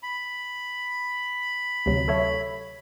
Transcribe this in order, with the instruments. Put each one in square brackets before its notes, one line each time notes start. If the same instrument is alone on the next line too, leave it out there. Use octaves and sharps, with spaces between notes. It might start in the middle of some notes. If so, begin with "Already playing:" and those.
[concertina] B5
[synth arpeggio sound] D2 C3 F#3
A4 C#5 E5